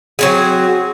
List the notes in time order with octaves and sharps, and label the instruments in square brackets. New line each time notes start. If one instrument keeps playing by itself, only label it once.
[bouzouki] F#3 C4 G#4